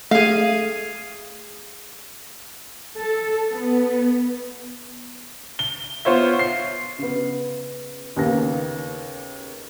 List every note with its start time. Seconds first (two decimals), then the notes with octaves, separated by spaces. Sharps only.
0.11 A3 G#4 F5 D#7
2.98 A4
3.51 B3
5.59 G7
6.05 B3 F4 C5 C#5 E5
6.39 C7
6.98 C#3 B3
8.16 D#2 C#3 A#3 B3 A#6